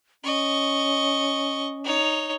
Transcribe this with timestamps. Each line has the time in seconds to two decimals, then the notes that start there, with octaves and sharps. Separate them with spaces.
0.24 C#4 D#5 C#6
1.84 D#4 C#5